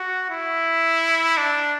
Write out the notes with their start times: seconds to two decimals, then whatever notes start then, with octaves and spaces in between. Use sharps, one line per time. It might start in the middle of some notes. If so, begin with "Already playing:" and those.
Already playing: F#4
0.30 E4
1.38 D4